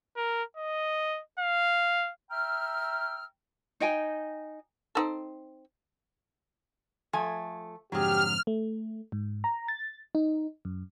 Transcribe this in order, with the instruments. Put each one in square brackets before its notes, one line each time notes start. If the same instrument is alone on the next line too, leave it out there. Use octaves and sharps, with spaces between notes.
[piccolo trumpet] A#4
D#5
F5
[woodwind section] E5 G5 A#5 E6 F6
[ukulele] D#4 D#5 G5 G#5
[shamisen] C4 D#4 A4
[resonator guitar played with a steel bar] F3 A3 G#5
[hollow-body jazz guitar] F2 G#2 D3 [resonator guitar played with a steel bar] F#3 G#4 [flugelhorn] G4 [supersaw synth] F6
[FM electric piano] A3
G#2
A#5
A6
D#4
F#2